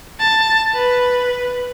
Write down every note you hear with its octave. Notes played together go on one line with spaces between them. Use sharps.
A5
B4